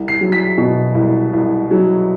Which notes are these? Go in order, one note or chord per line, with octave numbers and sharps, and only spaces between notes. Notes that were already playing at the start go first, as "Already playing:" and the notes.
Already playing: C2
C7
F#3
B6
B2
C2
C2
F#3